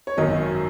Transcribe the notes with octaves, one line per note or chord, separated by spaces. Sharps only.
C#5
G#1 F#2 D#3 F#3 D#5